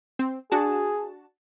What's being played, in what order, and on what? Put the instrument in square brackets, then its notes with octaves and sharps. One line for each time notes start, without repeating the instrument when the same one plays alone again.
[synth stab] C4
[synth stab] D4 F#4 A5 [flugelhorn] G#4